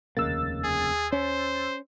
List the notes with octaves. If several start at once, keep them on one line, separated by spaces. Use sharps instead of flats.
F1 D#2 C#3 A#3 E6 A6
G#4
C#4 C5